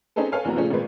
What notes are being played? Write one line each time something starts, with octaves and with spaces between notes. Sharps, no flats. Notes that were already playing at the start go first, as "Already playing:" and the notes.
C4 C#4 D#4 G#4 A4 B4
A4 B4 C#5 F5 G#5
F1 E3 A#3 B3 F#4 A#5
A#2 C#3 F3 A3 C#4 D4
G#1 A#2 G#3 A#3 B4